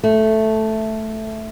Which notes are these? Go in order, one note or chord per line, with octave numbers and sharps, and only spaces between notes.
A3